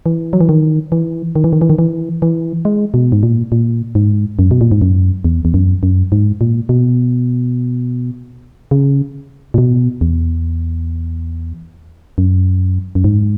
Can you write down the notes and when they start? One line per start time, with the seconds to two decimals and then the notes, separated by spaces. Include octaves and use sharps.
0.06 E3
0.33 F#3
0.41 E3
0.49 D#3
0.92 E3
1.36 D#3
1.44 E3
1.53 D#3
1.61 E3
1.70 D#3
1.79 E3
2.22 E3
2.65 G#3
2.94 B2
3.12 G#2
3.23 A#2
3.52 A#2
3.95 G#2
4.39 F#2
4.51 B2
4.61 A#2
4.72 G#2
4.82 F#2
5.25 E2
5.45 E2
5.54 F#2
5.83 F#2
6.12 G#2
6.41 A#2
6.69 B2
8.71 C#3
9.54 A#2
9.58 B2
10.01 E2
12.18 F#2
12.95 F#2
13.04 G#2